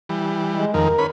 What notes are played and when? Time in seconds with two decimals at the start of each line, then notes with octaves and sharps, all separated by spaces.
0.09 E3 G3
0.55 G#3
0.74 F2 D#3 A#4
0.98 C#4 B4 B5